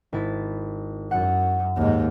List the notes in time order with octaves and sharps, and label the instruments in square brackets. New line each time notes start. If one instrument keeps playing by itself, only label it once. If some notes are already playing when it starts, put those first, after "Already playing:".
[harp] G#1 E4 A6
[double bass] F#2 [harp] F#5 A6
[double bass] D#2 G#2